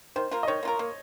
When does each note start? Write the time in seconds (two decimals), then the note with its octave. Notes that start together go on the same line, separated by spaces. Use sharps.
0.16 D#3 C5
0.31 A#3 F4 A#4
0.43 D#5
0.47 D#3 C#5
0.63 A#3 F4 A#4
0.79 A#3